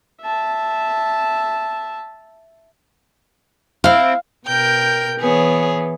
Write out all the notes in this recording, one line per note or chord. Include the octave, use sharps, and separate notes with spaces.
E5 A5
C4 E4 F5
B2 A#4 G5 G6
E3 B3 G#4 C#5